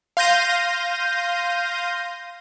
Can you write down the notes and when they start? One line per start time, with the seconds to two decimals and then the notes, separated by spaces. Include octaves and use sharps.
0.17 F5 C6 G6 A#6 D#7